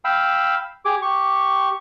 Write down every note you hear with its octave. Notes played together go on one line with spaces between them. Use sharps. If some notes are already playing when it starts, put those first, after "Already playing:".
F5 G5 B5 E6
G4 G#4 D6
G4 C#6